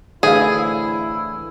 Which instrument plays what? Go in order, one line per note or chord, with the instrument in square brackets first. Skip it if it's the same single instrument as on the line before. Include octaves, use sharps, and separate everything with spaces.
[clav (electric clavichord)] A2 D3 E3 [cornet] E4 [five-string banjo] G#4 [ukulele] C5 E5 F5